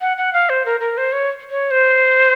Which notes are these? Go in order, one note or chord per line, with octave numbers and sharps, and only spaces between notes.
F#5
F#5
F5
C5
A#4
A#4
C5
C#5
C#5
C5